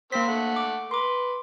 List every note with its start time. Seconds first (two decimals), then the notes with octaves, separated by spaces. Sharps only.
0.12 A#3 C4 A#4 C5 B6
0.28 A3 F#5
0.56 D6
0.91 B4 C6 D6